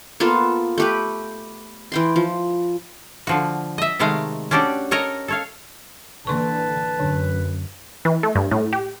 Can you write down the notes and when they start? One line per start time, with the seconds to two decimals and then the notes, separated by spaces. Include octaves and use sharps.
0.20 A#3 B3 F4 A4
0.78 A3 G4 B4
1.92 E3 G5 C6
2.16 F3
3.27 D3 F3 F#4
3.78 D#5 E5
3.99 C3 D#3 G#3 A3 F5 A#5
4.51 C#4 D4 F#4 G4 A4 D5
4.91 A4 A#4 C#5 D#5 A#5
5.28 A4 C#5 F5
6.27 D3 E3 A#3 B4 A5 C6 C#6
6.99 F#2 D3 D4
8.05 E3
8.23 A3
8.35 G2
8.51 A2
8.73 G4